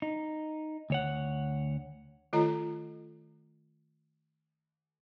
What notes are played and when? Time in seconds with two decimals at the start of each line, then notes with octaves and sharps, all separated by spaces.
0.02 D#4
0.90 D2 C#5 F#5
2.33 D#3 A3 F4 A4 D#5 A#5